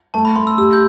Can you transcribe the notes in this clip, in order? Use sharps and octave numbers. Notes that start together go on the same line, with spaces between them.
A3 A5
B5
A3 C6
E6
G4 E6
G6